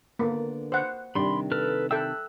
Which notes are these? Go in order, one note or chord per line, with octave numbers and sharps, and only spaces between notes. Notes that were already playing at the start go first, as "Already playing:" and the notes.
D3 A#3 B3
C5 F#5
C3 D#3 G3 D4 B5 C6
A4 B4 F6
A4 E5 G5 E6 F#6